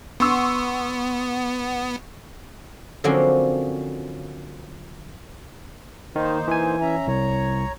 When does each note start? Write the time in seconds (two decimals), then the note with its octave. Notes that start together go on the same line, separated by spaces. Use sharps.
0.20 B3 C6 C#6 E6
3.04 D3 F3 F#3 A#3 C4 C#4
6.16 D#3 A#3 D#4 C5
6.48 E3 G#5
6.81 C#4 E5 A#5
7.07 C2 C#5 A#5